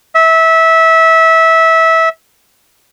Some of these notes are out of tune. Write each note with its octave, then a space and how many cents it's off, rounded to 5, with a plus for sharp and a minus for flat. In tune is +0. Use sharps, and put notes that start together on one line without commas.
E5 -20